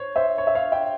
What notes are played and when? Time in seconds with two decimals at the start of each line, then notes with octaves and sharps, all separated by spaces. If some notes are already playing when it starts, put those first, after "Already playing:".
Already playing: C5 C#5
0.16 C5 E5
0.38 C#5
0.47 E5
0.55 C#5 F5
0.72 E5 G5